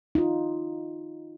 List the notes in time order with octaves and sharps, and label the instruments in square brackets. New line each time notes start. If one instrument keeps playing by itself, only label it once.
[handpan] D#4 F4